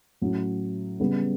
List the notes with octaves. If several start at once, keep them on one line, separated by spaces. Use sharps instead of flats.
A2 F#3 C#4
C#3 G3 B3